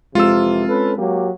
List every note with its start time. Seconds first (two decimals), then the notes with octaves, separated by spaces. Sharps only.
0.15 F2 C3 E3 G#3 C4 F4 E6
0.68 C#4 A4 B4
0.97 F#3 A#3 G4